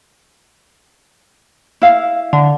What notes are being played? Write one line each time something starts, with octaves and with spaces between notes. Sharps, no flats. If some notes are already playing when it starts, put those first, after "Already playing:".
E4 F5
D3